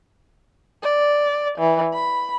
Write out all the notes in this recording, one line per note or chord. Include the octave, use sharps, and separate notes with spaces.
D5
E3
B5